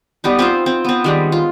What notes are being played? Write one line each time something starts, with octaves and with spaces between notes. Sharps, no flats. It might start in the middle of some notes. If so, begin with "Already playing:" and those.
G3 B3 D#4
C4 F4 C5
C4
B3 C4
D#3 G3 G#3
F4